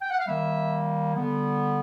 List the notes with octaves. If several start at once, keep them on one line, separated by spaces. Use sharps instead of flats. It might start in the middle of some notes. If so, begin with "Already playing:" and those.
G5
F#5
F5
D#3 G3 A#3 E5
D3 G3 B3